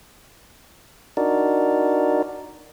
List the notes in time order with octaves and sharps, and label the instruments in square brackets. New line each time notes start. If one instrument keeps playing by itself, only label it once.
[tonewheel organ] D4 D#4 F#4 A#4 D5